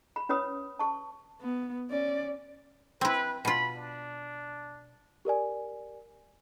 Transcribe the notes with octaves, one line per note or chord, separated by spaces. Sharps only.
B5
C#4 B4 C#5 B5 D#6
A5 C#6
B3
C#4 D5
C4 E4 B4
B2 F4 B5
D4
G4 A#4 D5 G#5